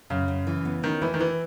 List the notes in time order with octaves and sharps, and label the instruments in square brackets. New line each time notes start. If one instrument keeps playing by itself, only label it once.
[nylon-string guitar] F#2 [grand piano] C#3
[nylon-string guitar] F#2
E3
B3
[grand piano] D#3 [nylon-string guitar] C#4
[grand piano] E3 [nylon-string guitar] E4
[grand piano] D#3
[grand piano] E3 [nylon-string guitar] E4